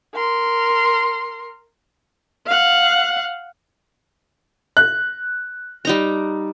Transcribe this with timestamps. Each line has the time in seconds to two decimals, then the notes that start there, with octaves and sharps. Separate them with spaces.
0.15 A#4 C6
2.46 F5 F#5
4.77 F#6
5.85 G3 D#4 A#5